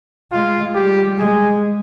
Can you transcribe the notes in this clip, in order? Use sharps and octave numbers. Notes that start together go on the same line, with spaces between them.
G#3 F4
G3 G4
G#3 G#4